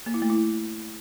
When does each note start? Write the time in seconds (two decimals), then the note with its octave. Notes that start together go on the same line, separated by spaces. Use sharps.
0.06 A#3
0.14 E4
0.22 A3
0.30 E4